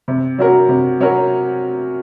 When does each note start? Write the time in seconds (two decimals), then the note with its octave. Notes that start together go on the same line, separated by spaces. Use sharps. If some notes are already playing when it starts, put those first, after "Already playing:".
0.08 C3
0.38 F#3 C#4 F#4 A#4
0.69 C3
1.00 F#3 C#4 F#4 A#4